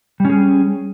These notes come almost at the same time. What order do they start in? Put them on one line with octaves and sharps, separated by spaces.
G3 C#4 G#4